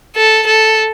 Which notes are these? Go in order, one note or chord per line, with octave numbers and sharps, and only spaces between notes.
A4
A4